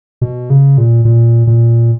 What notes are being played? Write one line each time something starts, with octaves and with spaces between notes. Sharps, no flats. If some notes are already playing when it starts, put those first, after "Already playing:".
B2
C#3
A#2
A#2
A#2